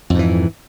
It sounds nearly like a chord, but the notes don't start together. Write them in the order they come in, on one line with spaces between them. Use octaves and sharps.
F2 G#2 E3